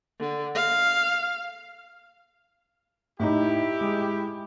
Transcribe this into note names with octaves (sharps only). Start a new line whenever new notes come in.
D3
F5
A2 D#4 E4 G4
G#3